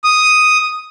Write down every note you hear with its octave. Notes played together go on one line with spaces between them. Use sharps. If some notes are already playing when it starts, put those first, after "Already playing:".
D#6